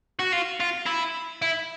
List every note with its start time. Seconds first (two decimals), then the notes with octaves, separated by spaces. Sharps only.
0.19 F#4
0.32 F4
0.60 F4
0.86 E4
1.42 E4